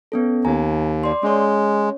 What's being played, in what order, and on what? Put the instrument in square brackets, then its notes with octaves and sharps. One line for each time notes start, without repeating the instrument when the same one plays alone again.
[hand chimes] B3 C#4 A4
[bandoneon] D#2 [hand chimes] G#5 A#5
[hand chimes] D5 C6
[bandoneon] G#3 [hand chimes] C#4 C#5